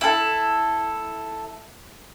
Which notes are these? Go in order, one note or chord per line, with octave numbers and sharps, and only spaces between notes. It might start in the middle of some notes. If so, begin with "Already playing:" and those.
E4 A4